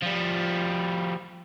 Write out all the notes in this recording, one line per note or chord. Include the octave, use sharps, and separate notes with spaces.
F3 G3